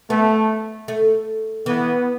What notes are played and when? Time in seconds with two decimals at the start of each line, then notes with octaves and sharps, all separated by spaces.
0.10 A3 B3
0.88 A3
1.66 E3 B3